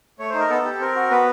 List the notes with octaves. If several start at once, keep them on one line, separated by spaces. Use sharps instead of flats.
A3 C#5
D#4 C5
A#4
B3 A4
G4
C4 A#4
F#4
B3 B4